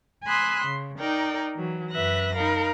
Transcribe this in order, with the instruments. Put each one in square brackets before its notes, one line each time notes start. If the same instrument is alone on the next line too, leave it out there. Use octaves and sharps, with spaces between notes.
[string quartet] G#5 B5 C6 D#6 E6 F#6
C#3
D#4 A#4 D5 G5
E3 F#3
F#2 B4 E5 F#6 A#6
D#4 A#4 F5 B5